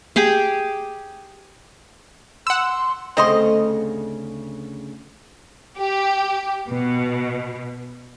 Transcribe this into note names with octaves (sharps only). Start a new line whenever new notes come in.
G4 G#4 G5
F#5 C6 E6
D2 C#3 A3 C4 D#5 C6
G4
B2